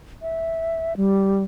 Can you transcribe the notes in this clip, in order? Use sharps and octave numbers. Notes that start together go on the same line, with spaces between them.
E5
G3